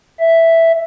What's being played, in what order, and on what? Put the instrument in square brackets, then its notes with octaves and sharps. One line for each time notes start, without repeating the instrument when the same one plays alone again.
[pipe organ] E5